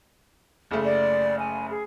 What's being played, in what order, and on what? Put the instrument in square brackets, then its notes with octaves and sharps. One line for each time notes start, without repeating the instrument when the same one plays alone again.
[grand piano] F#1 C#3 A3
[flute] D5
G#5
G#4